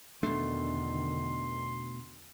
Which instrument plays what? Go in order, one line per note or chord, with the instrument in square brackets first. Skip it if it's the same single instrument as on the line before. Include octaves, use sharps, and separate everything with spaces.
[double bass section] E2 D3 D#3 [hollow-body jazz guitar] B2 A3 [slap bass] D4 [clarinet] C6